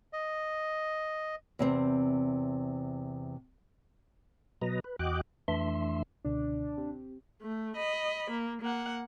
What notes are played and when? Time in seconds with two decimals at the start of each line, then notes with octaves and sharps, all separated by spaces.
0.13 D#5
1.59 E2 C3 C4
4.62 B2 F#3 B4 D#5 A#5
4.84 B4
4.99 E2 F#4 D#5 G5 D6 F#6
5.48 F2 E3 A3 D4 E5 C6
6.24 C#2 B2 D3 D4
6.77 C4 G4
7.41 A3
7.76 D#5 B5
8.30 A#3
8.61 A#3 F#5